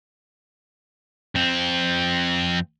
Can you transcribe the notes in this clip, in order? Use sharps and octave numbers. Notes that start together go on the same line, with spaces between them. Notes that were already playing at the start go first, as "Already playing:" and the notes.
F2 C4